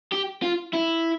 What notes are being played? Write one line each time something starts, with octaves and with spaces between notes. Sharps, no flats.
G4
F4
E4